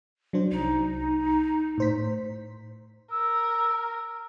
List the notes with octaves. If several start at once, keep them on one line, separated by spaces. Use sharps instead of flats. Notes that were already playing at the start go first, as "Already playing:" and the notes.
F#3 D4 C5
C2 D#4
A2 C5 B6
A#4 E6